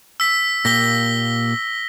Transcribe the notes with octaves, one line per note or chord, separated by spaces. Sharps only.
E6 B6
A#2 A#3 G4 A#6 B6 G7